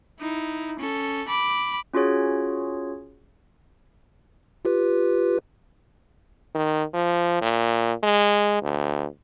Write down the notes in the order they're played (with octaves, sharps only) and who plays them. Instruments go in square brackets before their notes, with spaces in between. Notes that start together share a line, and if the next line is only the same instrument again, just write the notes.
[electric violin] D#4 E4
C#4 A4
B5 D6
[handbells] C#4 F4 F#4 G#4 C#5
[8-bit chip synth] F4 G4 B4
[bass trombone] D#3
F3
A#2
G#3
D2